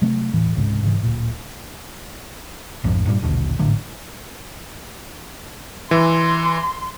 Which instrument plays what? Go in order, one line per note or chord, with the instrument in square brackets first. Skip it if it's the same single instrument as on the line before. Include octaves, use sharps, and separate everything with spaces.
[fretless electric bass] C3 F#3 A3 C4
D#1 A2 E3
C#2 G#2 C3
G#2 C#3 E3
D1 A#2
[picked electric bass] A#1 F2 G#2 F3
G2 A#2 G3
A#1 D#2 B2 D3
G#1 A2 D3 F#3
[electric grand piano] E3 [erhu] C6